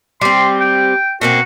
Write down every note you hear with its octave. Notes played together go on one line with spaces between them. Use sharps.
G3 C4 C6
G5
B2 A#3 C4 F#4